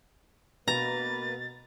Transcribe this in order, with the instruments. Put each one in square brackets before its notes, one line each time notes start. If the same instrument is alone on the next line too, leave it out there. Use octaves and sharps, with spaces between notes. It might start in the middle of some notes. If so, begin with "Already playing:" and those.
[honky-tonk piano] B2 [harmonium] A#3 B4 [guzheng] A#5 [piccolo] A6